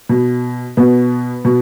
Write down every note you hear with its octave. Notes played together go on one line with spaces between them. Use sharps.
B2
B2 B3
B2